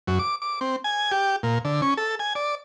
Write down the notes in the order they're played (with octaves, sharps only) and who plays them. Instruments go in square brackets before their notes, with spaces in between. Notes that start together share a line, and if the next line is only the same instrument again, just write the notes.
[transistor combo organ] F#2
D6
D6
C4
G#5
G4
A#2
D3
C#4
A4
G#5
D5